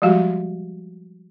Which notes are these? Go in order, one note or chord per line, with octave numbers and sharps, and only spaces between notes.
F3 G3 G#3 F#4 G4